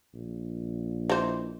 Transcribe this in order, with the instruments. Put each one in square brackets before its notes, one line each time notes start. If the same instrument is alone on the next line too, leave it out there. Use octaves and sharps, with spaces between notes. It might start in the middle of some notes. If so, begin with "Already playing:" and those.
[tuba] A#1
[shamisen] E3 D#4 C5